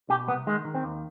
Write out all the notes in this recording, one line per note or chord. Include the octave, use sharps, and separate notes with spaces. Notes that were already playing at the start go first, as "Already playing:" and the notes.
B2 G4
C2 B3
D#3 G#3
D#3
C4
D#2